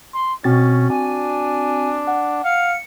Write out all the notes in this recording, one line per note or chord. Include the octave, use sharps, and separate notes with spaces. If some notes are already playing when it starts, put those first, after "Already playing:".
C6
B2 C4 C#4 F#4 A6
D4 G#5
F#5
F5 C#7